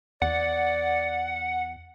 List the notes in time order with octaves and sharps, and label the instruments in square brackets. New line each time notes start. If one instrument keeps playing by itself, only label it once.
[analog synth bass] E2 [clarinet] D5 [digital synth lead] F#5